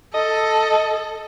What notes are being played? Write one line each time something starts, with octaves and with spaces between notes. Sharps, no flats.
A4 D#5